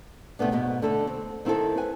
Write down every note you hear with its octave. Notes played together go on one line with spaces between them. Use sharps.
C3 A3 B3 D4
G#2 B2 B3
D3 A3 A4
C4
D#3 C4 E4 G4 A4
B4 G#5